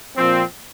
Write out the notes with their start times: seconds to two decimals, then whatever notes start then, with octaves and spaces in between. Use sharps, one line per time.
0.16 A#2 F3 C4